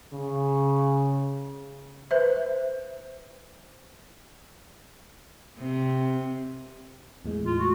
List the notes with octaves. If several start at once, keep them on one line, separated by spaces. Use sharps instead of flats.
C#3
B4 C5 E5
C3
E2 A2 G#3
F4
F#4